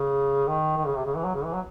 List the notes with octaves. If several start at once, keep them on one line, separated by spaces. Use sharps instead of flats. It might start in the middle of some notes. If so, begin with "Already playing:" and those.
Already playing: C#3
D#3
D#3
C#3
C3
C#3
E3
F#3
C#3
E3
F#3